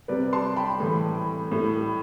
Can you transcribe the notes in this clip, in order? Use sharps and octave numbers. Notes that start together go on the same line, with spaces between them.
C3 G3 B4 D5
A5 C6
G5 B5
A2 E3 G3
A2 G3